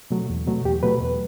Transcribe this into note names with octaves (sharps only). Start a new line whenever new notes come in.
B2 F#3 A3
E2
B2 F#3 A3
E2 G4
B2 F#3 A3 B4
E2